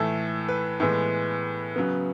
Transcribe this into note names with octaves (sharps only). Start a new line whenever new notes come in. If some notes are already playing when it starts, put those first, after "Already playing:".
Already playing: A2 E3 A3 A4
B4
A2 E3 G#3 B3
C#3 F#3 B3